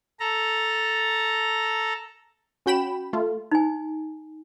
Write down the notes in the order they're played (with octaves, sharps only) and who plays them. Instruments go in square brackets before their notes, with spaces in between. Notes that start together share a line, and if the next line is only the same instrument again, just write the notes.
[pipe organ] A4 A#5
[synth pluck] C#4 F#4 G5 B5 E7
A3 F4
[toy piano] D#4 G#5